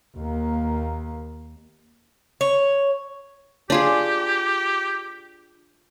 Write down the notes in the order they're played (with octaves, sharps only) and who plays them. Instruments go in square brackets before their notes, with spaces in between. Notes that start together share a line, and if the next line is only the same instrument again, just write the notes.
[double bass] D#2 A#3
[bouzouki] C#5
[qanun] D4 F4 G#4 [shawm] G4